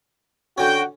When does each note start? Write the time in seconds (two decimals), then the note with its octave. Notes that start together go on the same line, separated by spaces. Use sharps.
0.58 D3 C#4 F#4 G5